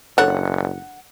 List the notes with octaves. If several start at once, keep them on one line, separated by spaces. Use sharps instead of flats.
F#1 D4 A4 C#5 F#5